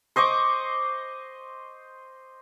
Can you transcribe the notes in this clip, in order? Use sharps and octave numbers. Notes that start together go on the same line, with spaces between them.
C5 D#5 C#6 D6